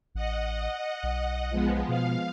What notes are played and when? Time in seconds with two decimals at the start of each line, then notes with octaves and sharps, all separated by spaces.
0.15 A1 D#5 F#5
1.03 B1
1.50 F3 G#3 B3
1.88 B2 F5